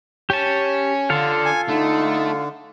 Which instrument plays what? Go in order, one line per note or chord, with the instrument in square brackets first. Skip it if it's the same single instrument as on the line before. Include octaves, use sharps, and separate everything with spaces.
[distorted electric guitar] C#4 [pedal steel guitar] G4 A5
[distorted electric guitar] D3 [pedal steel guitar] F4 A4 F5
[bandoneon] G#5
[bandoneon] D3 [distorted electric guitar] A3 [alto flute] D#4